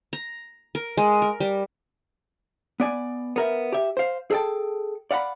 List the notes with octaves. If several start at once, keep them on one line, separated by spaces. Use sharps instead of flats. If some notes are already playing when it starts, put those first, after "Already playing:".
A#5
A#4
G#3
A#4
G3
B3 D5 G#5
B3 A#4 E5
G4 E5
C5 F5
G#4 A4 D#5 G5 A5
D5 F5 F#5 A#5 B5